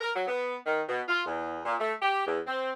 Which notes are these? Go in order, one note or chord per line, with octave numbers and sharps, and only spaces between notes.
A#4
F#3
B3
D#3
B2
F4
E2
A#2
A3
G4
E2
C4